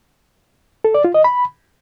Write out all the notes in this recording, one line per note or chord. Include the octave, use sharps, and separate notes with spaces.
A4
D5
F4
D#5
B5